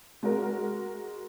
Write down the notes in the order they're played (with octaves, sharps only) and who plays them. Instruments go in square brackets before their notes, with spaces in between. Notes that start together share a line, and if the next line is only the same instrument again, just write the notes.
[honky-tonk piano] G#3 F#4 A#4